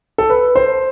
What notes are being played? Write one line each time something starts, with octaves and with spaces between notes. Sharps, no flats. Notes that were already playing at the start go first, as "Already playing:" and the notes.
A4
B4
C5